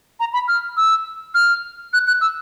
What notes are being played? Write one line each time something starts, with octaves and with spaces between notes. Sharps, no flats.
A#5
B5
F6
E6
F6
F#6
F#6
E6